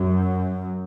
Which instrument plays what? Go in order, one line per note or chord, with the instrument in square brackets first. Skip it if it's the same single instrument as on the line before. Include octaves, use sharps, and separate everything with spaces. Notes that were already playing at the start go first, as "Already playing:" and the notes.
Already playing: [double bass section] F#2